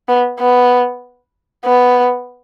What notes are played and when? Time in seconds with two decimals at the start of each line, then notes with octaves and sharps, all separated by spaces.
0.08 B3
0.40 B3
1.65 B3